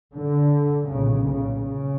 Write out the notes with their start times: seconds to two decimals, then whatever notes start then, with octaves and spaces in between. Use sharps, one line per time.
0.15 D3
0.90 B1 A#2 C#3
1.27 C#3
1.64 C#3